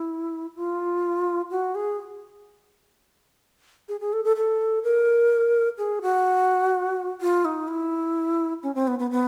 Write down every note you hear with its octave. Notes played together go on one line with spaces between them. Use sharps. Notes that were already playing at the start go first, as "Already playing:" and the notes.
Already playing: E4
F4
F#4
G#4
G#4
G#4
A4
A4
A4
A#4
G#4
F#4
F4
D#4
E4
C#4
C4
B3
B3
B3